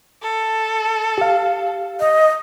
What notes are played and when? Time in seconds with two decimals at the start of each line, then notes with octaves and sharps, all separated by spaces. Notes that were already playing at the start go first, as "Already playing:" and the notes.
0.22 A4
1.18 G4 F5
2.00 D#5